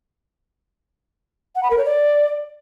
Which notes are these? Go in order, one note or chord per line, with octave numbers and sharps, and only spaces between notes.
F#5
B5
A#4
C#5
D5